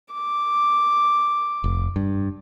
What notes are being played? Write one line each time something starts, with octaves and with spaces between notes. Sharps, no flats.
D6
F1
G2